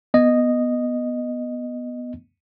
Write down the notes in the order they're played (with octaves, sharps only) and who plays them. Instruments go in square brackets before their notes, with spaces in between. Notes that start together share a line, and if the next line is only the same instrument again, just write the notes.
[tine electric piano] B3 D#5